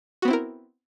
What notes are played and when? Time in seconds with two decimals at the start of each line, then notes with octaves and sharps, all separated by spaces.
0.22 F#4
0.25 B3
0.28 C4
0.30 E4
0.33 A#4